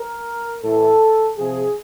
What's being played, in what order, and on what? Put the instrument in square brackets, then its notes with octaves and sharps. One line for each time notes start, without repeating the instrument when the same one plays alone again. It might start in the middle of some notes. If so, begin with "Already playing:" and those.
Already playing: [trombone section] A#4
A2 E3 A4
C3 F3 G#4